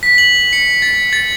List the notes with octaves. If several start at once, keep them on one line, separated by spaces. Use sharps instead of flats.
B6
F#7
C#7
A6
A6